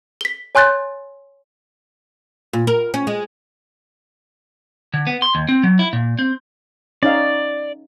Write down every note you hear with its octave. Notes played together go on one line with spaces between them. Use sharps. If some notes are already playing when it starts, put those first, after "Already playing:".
B6 G7
C#5 G#5 C6 F#6 G6 A6
A#2
A#4
C#4
G#3
D3
B3
C6
D#2
C4
F#3
E4
A#2
C4
C#4 D#4 D5 F5